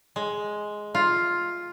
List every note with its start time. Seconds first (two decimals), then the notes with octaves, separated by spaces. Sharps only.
0.16 G#3
0.95 F4